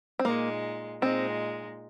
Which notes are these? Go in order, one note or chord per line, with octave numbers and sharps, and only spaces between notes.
C4
A#2 G#3 A#3 D#4
A#2 G#3 C4 D#4